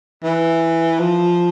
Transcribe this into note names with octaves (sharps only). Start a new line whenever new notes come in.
E3
F3